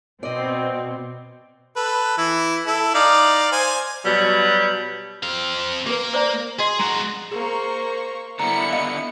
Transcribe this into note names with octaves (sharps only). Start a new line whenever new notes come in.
B2 C4 D5 D#5
A4 B4
E3 E4
E4 A4
D#4 D5 F5
C5 G#5
B2 F#3 G3
C4 F5
A#3 G4 B4
C5 D5 A#5
F#4 G#4 D#5 C6
G#3 F#4 A#5
A#3 G#4 C5 C#6
D3 B3 E4 A#5 C#7
D#5 F5